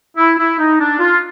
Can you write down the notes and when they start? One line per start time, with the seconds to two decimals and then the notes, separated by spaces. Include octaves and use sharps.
0.18 E4
0.38 E4
0.59 D#4
0.80 D4
1.00 F4